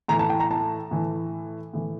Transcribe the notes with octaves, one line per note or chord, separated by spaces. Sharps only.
A2 E3 A#5
A5
G5
A#5
A5
A2 E3
A2 E3